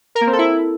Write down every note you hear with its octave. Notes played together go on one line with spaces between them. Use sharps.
A#4
A#3
C4
A4
E4